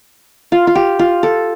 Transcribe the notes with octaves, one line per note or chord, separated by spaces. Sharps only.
F4
F4
G4
F4
A4